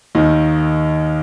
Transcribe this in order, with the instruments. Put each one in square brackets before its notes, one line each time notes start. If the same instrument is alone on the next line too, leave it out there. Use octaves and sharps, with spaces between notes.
[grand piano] D#2 D#3 D#5